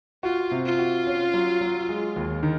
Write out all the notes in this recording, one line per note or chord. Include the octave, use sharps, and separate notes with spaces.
F4 F#4
C3
F4
F#4
C#4
F#3
F#3
G#3
D#2
D#3